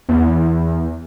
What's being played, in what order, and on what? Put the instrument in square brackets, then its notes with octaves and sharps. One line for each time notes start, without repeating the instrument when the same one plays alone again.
[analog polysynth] E2